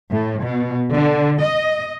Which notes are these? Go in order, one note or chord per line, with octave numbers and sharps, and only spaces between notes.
A2
B2
D3
D#5